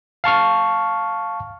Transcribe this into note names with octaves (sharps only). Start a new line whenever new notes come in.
F5 A5 C#6 F6